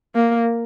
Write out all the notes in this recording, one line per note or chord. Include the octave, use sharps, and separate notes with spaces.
A#3